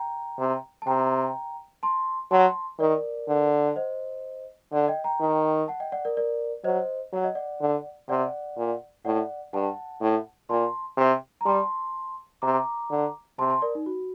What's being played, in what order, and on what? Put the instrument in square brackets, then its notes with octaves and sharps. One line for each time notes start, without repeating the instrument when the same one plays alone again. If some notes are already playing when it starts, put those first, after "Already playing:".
Already playing: [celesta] G5 A#5
[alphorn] C3
[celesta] A5
[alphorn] C3 [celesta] G5 A#5
[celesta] A5 C6
[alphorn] F#3 [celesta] A5 C6
[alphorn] D#3 [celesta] A#4 D5
[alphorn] D3
[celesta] F#5
C5 D#5
[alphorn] D3 [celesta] D5 F#5
[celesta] D#5 G5
G5 A#5
[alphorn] D#3
[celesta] F#5 A5
D#5 G5
D5 F#5
A#4 D5
A#4 D5
[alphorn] F#3 [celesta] C5 D#5
[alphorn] F#3 [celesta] F#5
[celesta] D#5
D5 F#5
[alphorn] D3
[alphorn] C3 [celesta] D5 F#5
[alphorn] A#2
[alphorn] A2 [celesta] D5 F#5
[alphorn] G2 [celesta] F#5 A5
[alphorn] A2
[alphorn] A#2 [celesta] A5 C6
[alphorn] C3
[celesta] A#5
[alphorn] G3 [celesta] A5 C6
[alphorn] C3 [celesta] A#5 D6
[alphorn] D3
[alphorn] C3 [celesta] A5 C6
[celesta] A5 C6
A#4 D5
D#4
F#4